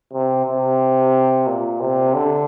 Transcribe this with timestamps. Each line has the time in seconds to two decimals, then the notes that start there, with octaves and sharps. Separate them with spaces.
0.13 C3
0.46 C3
1.47 A#2
1.80 C3
2.14 D3